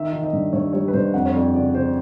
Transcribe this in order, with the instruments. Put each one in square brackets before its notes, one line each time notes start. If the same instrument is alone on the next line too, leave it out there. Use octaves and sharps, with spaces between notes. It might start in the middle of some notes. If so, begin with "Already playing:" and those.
Already playing: [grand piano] D#3 E5
D#3
D#5
G2
G2 C#5
G3 C#5
B4
G2 C5
F2 F#5
C#5
F2 D5
C#3 D5
C#3 C5